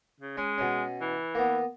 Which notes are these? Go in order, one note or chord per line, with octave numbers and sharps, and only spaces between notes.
C#3
G#3 C#4
B2 C#4
E3
A#3 B3